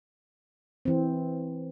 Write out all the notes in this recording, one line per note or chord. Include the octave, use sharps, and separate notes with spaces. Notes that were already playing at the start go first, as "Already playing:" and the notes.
E3 C4